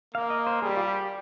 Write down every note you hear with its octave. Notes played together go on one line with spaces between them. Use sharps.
A#3 F5
D#5
C5
G3 G#4
G4
F4
G4